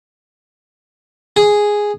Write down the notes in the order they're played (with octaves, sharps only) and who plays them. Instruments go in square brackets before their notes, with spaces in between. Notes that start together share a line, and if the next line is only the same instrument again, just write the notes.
[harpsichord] G#4